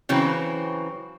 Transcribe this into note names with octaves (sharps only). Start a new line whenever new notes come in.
C#3 E3 F#3 C4